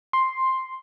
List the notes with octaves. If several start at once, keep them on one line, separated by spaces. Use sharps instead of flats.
C6